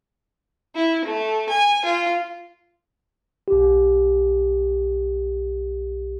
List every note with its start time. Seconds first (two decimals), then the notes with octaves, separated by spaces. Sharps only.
0.75 E4
1.05 A3
1.49 G#5
1.85 F4
3.48 B1 G4